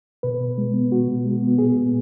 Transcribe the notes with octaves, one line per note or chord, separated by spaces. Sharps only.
B2 B4
B2
G#3
B3
B2 F#4
B2
G#3
B3
A#2 G#4
A#2